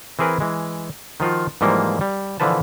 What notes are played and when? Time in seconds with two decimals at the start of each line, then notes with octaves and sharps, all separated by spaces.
0.19 E3 C4 G#4 A#4 B4
0.40 E3 G#3
1.20 D#3 F3 F4 F#4
1.61 G#2 E3 F3 G3 A#3
2.01 G3
2.40 A#2 D3 E3 F3 B4 A5